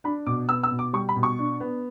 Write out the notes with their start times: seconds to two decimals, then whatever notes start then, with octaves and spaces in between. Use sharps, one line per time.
0.04 D4 B5
0.26 B2 D6
0.49 B3 E6
0.63 E6
0.71 B2
0.79 D6
0.93 G3 C#6
1.09 B5
1.16 B2
1.23 C#6
1.39 D4
1.60 B3